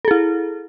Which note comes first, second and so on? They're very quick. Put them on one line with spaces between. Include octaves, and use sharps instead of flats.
A4 G#4 E4